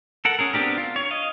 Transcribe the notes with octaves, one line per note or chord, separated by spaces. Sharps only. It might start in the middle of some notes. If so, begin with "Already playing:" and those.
A4 A#4 F#5
C#4 G#4 A#4
B3 C4 D4 G4 A#4
F4
C#5
D#5 F5